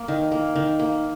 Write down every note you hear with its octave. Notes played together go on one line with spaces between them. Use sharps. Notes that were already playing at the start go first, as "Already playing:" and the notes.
Already playing: A#3
D#3
A#3
D#3
A#3